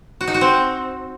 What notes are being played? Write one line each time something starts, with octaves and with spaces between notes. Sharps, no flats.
F#4
D#4
F#4
C4